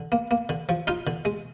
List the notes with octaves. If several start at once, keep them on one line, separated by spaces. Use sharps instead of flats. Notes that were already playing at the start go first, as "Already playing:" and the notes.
Already playing: D3
A#3
A#3
D3
F3
D#4 F4 F5
D3
G#3